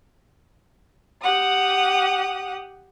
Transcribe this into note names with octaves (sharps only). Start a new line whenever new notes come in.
G4 F#5 D#6